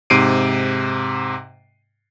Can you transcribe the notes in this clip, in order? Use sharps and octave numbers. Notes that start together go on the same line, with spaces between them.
G#2 C3 C7 D7 D#7